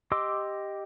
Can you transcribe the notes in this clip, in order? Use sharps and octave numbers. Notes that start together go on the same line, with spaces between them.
G4 D#5 C6 D6 E6